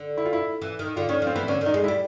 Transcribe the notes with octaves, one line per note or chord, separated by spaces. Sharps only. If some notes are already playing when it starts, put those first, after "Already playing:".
Already playing: D3
E4
F4
E4
E3
D#3
D3 F4
D#3 C#4
F3
C4
E3 B3
D3 C#4
D#3
D#4
G#3
E4
G3